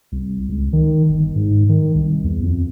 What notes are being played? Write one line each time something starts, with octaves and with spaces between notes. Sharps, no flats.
C2
C#2
D#3
G1
G#2
D#3
C2
E2
F2